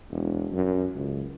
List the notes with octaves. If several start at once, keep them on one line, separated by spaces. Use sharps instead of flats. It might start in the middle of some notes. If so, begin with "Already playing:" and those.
E1
F#2
C#2